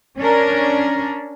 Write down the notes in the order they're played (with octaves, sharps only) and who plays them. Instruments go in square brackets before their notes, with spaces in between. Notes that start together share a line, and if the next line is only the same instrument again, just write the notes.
[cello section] C#4 D4 A#4